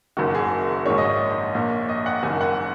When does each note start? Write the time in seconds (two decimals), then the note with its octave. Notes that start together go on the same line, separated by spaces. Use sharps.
0.17 F#1 F#2 D#3 F#4
0.35 G#4
0.86 A#1 G#2 D#3 C#5
0.98 D#5
1.09 C#5
1.55 A#1 A#2
1.89 D#5
2.06 F#5
2.23 F#1 F#2 D#3 G#5
2.41 F#5